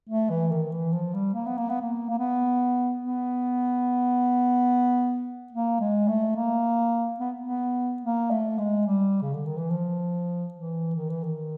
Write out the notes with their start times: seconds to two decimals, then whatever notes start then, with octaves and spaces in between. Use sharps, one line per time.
0.09 A3
0.30 E3
0.51 D#3
0.71 E3
0.93 F3
1.14 G3
1.34 A#3
1.46 B3
1.58 A#3
1.69 B3
1.81 A#3
2.09 A#3
2.18 B3
3.02 B3
5.52 A#3
5.80 G#3
6.08 A3
6.36 A#3
7.20 B3
7.40 B3
8.02 A#3
8.30 A3
8.58 G#3
8.86 G3
9.22 C#3
9.34 D3
9.46 D#3
9.57 E3
9.70 F3
10.53 E3
10.95 D#3
11.10 E3
11.24 D#3